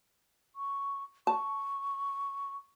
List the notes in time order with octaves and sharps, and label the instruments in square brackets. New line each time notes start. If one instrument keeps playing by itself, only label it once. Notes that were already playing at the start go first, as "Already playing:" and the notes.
[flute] C#6
[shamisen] A5 [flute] C#6